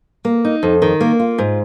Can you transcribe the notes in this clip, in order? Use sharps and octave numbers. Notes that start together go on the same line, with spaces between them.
A#3
D#4
F2
D#3
A#3
F4
G#2